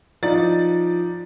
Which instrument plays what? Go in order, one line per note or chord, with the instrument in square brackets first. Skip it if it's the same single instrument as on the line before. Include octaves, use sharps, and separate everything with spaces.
[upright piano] F3 D#4 D5 A6